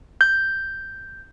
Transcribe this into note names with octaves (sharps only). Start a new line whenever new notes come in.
G6